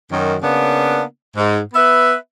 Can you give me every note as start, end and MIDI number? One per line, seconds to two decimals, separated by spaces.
0.11 0.36 42
0.11 0.36 51
0.41 1.02 49
0.41 1.02 58
0.41 1.02 59
0.41 1.02 62
1.36 1.59 44
1.74 2.14 59
1.74 2.14 71
1.74 2.14 76